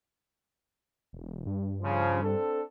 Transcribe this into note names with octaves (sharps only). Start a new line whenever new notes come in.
E1
G2
C#3 F3
C4 D4 A4